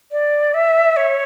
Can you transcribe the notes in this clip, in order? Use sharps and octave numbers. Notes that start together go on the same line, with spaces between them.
D5
E5
C#5